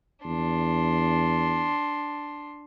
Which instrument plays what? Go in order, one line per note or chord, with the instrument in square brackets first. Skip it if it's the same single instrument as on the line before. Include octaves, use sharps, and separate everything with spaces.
[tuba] E2 [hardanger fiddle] D4 C6